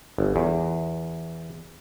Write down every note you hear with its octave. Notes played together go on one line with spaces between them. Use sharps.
G1
E2